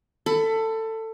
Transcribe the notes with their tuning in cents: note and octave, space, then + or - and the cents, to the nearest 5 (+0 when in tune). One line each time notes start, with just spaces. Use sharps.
A4 +20 B5 +20